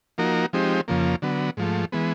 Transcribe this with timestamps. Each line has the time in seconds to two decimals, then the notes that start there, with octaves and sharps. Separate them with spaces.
0.18 F3 A#3 D#4 F#4 A#4
0.53 F3 G#3 C4 D#4 G4
0.88 F2 C#3 F3 A#3
1.22 D3 F#3 B3
1.57 G#2 F3 A3
1.92 E3 G#3 B3